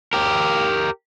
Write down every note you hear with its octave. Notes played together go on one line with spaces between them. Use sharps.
G4 A#4